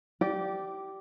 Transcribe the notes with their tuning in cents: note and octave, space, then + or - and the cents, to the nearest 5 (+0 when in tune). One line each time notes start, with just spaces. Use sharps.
G4 -20 D5 +0